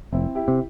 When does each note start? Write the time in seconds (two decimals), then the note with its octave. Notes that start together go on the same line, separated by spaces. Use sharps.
0.13 F1 C4 E4
0.35 E4 G4
0.48 C3